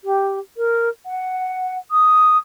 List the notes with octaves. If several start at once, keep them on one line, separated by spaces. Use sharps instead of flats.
G4
A#4
F#5
D#6